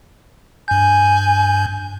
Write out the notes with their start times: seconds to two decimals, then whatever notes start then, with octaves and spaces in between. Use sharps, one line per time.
0.68 G2 G#5 G6